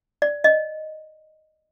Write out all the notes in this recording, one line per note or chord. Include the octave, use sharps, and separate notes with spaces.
D5
D#5